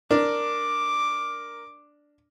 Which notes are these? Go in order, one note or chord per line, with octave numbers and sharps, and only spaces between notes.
D4 A#4 D6